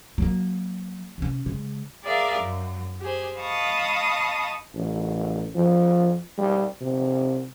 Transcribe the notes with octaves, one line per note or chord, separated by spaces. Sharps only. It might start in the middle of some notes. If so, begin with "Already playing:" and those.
F#3 A#3
C3 C#4
C#3 G#3
G#4 A#4 D5 E5 F5
F#2
G4 G#4 C5
D#5 F5 A5 B5 C#6 D#6
A1
F3
G3
C3